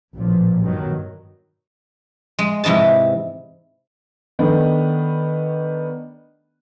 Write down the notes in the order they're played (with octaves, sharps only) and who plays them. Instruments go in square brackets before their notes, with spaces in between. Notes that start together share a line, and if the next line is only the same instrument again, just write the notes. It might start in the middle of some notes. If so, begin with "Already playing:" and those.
[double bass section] A1 A#2 F3
G2 B2 D#3 F#3
[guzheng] G#3
G#2 C3 E3 D#5 A5
[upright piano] D#3 A3 B3 D4